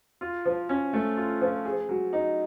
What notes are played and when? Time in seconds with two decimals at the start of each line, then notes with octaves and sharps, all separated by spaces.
0.21 F4
0.45 F3
0.69 C#4
0.93 A3
1.17 F4
1.41 F3
1.65 G#4
1.89 F#3
2.13 D#4